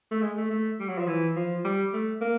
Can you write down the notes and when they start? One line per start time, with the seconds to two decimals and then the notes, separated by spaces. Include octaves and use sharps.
0.11 A3
0.22 G#3
0.37 A3
0.51 A3
0.80 G3
0.89 F#3
0.98 F3
1.07 E3
1.36 F3
1.64 G3
1.93 A3
2.21 A#3